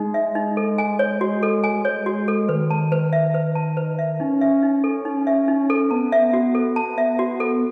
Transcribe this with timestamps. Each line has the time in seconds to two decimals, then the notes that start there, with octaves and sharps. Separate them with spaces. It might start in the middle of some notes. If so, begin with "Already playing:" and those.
Already playing: G#3 D#4
0.14 E5
0.35 D#4
0.57 A4
0.78 G#5
0.99 C#5
1.21 F#4
1.43 A4
1.64 G#5
1.85 C#5
2.06 F#4
2.28 A4
2.49 D#3 B4
2.71 A5
2.92 B4
3.13 E5
3.34 B4
3.55 A5
3.77 B4
3.99 E5
4.20 C#4 D#4
4.41 E5
4.63 D#4
4.84 A4
5.05 D#4
5.27 E5
5.48 D#4
5.70 A4
5.91 B3 A5
6.12 E5
6.34 F#4
6.55 A4
6.76 A5
6.98 E5
7.19 F#4
7.40 A4